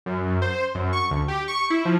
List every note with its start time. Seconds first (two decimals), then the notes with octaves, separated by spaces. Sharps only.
0.06 F#2
0.42 C5
0.75 F#2
0.93 C#6
1.11 D2
1.28 G4
1.48 C#6
1.70 E4
1.85 F3